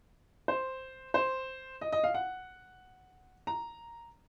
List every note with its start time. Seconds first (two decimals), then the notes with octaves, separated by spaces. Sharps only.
0.48 C5
1.14 C5
1.81 D#5
1.92 D#5
2.04 F5
2.14 F#5
3.47 A#5